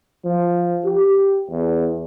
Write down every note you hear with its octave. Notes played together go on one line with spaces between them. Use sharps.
F3
G4
E2